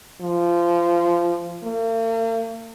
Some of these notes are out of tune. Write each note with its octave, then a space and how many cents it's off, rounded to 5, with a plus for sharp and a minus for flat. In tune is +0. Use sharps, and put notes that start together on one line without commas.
F3 -20
A#3 -45